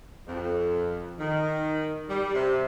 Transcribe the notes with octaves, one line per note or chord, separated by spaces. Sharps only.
F2
D#3
G3
C3